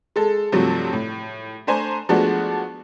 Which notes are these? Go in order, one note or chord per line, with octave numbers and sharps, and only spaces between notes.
G#3 A4
G2 C3 F3 F#3 A3
A2
A3 D4 C5 G#5 A#5
F3 G#3 A3 B3 D4 F#4